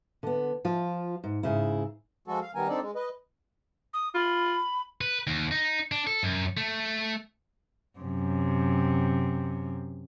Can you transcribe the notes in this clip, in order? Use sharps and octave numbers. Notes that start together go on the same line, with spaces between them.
D3 B3
F3 F4
G#2
G#2 C#3 E4
F3 G#3 F#4 A4
F5
D#3 G3 B3 A#4 G#5
C4 D4 D#4 A4 D5
G#3
B4 D#5
D#6
F4 B5
B4
D#2
D#4
D4
A4
F#2
A3
F#2 C3